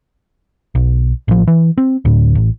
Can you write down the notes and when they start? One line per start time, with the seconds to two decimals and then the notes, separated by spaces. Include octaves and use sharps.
0.75 B1
1.28 A1 F3
1.47 E3
1.78 C4
2.05 D2 A2
2.35 A1